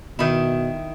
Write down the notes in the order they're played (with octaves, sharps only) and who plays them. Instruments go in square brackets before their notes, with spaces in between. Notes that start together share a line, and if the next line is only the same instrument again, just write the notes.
[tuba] B2 [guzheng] D#3 E4